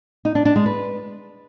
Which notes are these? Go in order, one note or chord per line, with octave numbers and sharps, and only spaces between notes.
D#4
D4
D4
G#3
B4